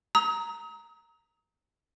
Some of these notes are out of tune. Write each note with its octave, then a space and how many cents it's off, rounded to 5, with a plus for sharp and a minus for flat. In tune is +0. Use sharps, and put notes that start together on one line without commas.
A#5 +0 D#6 +40